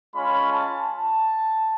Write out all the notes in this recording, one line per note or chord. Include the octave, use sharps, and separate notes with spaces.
G#3 C#4 F4 B5
A5
A5